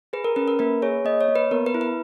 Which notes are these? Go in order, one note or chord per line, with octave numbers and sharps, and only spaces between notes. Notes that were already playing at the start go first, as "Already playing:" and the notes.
G#4 B4
A#4
C#4 B4
A#4
A#3 B4
G#4 C#5
A#3 D#5
C#5
A#3
B4
B3 A#4
B4
E4
B4